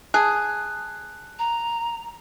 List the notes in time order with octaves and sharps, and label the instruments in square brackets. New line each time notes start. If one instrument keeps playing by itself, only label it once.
[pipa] G#4 [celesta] A5 [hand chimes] F#6
[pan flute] A#5